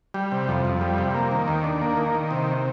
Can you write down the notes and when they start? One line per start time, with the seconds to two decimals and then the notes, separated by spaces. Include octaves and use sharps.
0.14 G3
0.32 C3
0.48 F2
0.65 F2
0.81 G3
0.98 C3
1.14 A#3
1.31 D#3
1.48 D#2
1.64 D4
1.81 A#3
1.97 D#3
2.14 D#3
2.31 C3